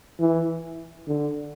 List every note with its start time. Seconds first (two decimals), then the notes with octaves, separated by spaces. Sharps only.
0.20 E3
1.08 D3